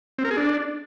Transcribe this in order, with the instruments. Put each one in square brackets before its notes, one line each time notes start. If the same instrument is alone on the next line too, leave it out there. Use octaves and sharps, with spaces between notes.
[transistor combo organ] C4
A#4
G#4
D4